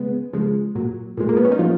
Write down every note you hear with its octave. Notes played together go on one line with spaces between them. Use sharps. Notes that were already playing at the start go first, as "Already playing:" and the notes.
Already playing: C#3 G#3 B3
C#3 F3 G#3
A#2 F#3
A#2 F3 G#3
A#3
B3
C#4
D#4
A#2 F3 F#3 F4